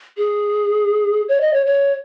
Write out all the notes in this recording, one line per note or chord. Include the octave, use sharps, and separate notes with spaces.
G#4
C#5
D#5
C#5
C#5